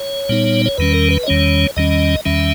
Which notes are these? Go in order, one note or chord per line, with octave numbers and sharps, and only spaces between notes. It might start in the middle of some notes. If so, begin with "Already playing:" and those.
Already playing: C#5
A#2 G3 B3 D#4
C#5
E2 D#3 G3 C#4 B4
A#4
B4
D#5
E2 D#3 G3 C#4 C#5
E2 D#3 G3 C#4 D#5
E2 D#3 G3 C#4 E5